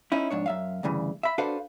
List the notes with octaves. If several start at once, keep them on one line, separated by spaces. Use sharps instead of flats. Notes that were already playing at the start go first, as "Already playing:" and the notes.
C#4 D#4 E4
F2 G#2 D4 C#5
F#2 E5 F5
D2 G2 C#3 E3
E5 B5
D4 F#4 A4 B4 C5 F5